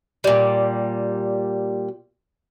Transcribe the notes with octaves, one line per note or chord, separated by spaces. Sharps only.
A#2 G3